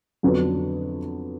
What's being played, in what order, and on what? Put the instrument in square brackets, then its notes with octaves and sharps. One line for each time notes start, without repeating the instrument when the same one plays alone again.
[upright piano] F2 D3 F#3 B3 D4